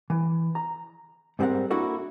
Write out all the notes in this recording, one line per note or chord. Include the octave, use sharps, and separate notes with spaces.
E3
A#5
G#2 G3 C4 A4 A#4 F#5
A#3 D4 E4 F#4 A4 A#4